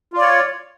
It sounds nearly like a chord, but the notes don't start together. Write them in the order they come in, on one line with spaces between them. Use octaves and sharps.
F4 D5 C#5